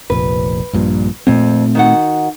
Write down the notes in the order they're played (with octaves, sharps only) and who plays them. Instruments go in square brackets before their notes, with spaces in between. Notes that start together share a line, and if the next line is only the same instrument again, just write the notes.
[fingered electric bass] F1 A#1 [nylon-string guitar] B4
[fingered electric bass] A#1 G2 A#2
[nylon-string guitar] F2 [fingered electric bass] A#2 A3 C4
[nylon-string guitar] D#3 F#4 F#5